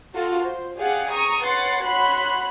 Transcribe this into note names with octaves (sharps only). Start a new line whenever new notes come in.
F4 F#4 A4
C5
G4 G#4 D5 F5 F#5
A#5 C#6 D#6
B4 C#5 F#5 C6 A6 C7
F#4 C#5 B5 C6 F#6